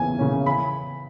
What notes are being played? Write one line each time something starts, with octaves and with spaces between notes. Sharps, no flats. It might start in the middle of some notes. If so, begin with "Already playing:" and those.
Already playing: E2 C#3 E3 A#3 C#4 G#5
C#3 E3 A#3 C#4
B5